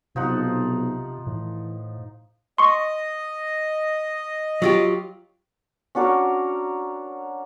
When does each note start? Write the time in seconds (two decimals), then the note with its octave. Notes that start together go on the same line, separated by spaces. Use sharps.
0.16 B1 C3 F3 D#4 F#5
1.27 A2 E3
2.58 D#5 C6 C#6
4.62 F#3 F4 G4
5.95 C#4 D4 F#4 A#4